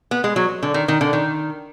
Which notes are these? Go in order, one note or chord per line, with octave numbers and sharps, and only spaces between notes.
B3
G#3
F#3
D3
D#3
D#3
D3
D#3